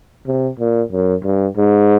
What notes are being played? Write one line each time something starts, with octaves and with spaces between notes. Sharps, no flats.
C3
A#2
F#2
G2
G#2